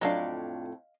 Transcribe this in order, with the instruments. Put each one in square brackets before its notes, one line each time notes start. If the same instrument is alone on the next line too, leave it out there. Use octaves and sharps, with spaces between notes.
[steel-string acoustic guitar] F2 A2 [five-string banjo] F#3 D4 [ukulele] D#5 F5